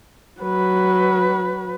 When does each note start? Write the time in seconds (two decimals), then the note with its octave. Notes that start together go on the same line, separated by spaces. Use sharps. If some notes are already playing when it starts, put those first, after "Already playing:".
0.41 F#3 B4